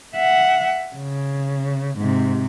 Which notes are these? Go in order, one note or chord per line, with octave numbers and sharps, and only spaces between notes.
E5 F#5
C#3
G#2 C3